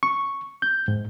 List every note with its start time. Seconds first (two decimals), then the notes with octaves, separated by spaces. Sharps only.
0.03 C#6
0.62 G6
0.88 G#2